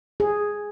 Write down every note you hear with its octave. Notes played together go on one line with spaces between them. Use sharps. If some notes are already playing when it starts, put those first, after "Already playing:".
G#4